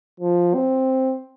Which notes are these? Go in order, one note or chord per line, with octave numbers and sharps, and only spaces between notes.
F3
C4